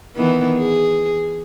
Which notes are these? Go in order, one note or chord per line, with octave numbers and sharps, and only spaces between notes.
D#3 E3 B3
G#4